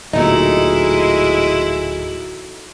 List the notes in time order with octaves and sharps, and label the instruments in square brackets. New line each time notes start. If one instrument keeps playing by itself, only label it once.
[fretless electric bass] D1 A#2 [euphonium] G#3 [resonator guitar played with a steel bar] A3 D#4 [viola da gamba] E4 F#4